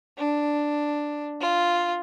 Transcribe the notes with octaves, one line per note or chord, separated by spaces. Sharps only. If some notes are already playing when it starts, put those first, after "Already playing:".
D4
F4